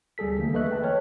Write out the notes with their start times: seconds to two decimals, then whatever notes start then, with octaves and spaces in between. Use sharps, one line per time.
0.18 D2 G3 G#4 A4 B6
0.38 D3 E3 A3 A#3
0.54 A4 B4 D#5 E5 C#6 F#6
0.71 G5 A5
0.83 B4 C#5 F6